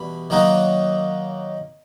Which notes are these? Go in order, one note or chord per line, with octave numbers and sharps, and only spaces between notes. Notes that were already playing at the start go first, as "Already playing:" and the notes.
Already playing: E2 B2 G3 B5
D#3 F#3 A#3 D#4